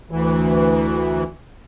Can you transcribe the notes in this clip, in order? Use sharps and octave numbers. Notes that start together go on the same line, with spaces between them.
D2 E3